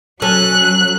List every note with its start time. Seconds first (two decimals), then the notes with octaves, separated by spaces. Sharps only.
0.22 F#3 C#4 A4 F#6